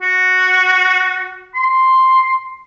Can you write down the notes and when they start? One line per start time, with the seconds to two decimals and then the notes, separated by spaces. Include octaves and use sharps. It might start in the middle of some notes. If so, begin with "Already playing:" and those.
0.02 F#4
1.55 C6